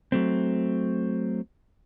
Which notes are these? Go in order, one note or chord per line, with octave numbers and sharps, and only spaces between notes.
F#3 A3 C4